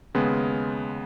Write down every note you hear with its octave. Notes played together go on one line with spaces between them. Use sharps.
D#2 C#3 G#3 B3